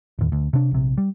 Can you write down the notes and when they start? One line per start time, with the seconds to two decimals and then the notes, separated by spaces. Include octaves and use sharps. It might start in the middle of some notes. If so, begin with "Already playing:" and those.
0.19 D1 D#2
0.32 D2
0.53 C3 D4
0.71 A#1 C3
0.98 G3